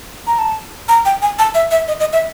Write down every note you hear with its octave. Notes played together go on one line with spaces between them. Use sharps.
A#5
A5
A#5
G5
G#5
A5
E5
E5
D#5
D#5
E5